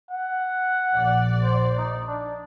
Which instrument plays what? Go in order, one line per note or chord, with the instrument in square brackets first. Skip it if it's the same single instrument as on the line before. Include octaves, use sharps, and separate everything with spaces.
[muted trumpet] F#5
[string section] A#1 D5
[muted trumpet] C5
D#4
D4